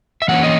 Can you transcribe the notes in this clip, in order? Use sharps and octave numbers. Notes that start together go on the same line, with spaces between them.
E5
E3 A#3 C#4 F#5
D#5